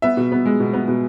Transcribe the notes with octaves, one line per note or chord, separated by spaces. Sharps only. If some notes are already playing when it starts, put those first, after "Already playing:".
B3 E5
B2
B3
G#3
B2
B3
B2